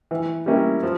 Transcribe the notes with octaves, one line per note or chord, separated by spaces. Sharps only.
E3
G3 A#3 C#4 E4
F3